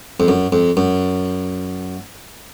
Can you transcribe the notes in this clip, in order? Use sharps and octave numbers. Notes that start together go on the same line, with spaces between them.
F2
F#2
F2
F#2